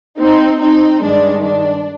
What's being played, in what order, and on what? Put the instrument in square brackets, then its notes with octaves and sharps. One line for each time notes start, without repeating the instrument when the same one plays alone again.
[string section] C4 D#4
C4 D#4
G2 D#3 G#3 D4
D4